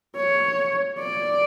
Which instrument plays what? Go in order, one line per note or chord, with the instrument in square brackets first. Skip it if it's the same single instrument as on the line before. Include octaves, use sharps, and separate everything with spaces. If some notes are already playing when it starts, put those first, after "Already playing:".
[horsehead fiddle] C#5
D5